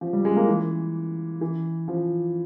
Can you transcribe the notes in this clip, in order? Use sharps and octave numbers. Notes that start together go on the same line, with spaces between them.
F3
G3
G#3
A#3
E3
E3
F3